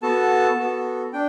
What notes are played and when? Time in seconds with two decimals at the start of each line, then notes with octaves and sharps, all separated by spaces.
0.02 B3 F#4 A4 A5
0.58 B3 F#4 A4
1.13 D4 G5